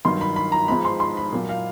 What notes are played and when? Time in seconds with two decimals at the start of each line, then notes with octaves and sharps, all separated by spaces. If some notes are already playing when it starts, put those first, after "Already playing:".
0.05 G2 D#3 F#3 C6
0.21 B5
0.36 B5
0.52 A#5
0.68 G#2 F3 G#3 B5
0.85 C6
1.00 C6
1.17 B5
1.32 A#2 F#3 A#3
1.49 F5